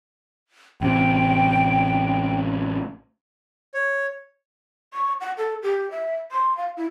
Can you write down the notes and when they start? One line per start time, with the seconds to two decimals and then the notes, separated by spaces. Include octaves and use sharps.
0.81 A1 C3 G5
3.74 C#5
4.93 C#6
5.21 F#5
5.38 A4
5.63 G4
5.91 E5
6.31 C6
6.57 F5
6.77 E4